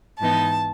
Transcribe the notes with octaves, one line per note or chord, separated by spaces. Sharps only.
G#2 E3 B3 D#4 A5